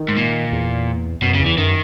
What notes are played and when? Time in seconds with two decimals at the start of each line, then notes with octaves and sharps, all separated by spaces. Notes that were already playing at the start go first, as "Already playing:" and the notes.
Already playing: D#3
0.08 G#2
0.17 A#2
0.52 E2
1.22 F#2 B2
1.34 C#3
1.39 E2
1.46 E3
1.57 F#2 D#3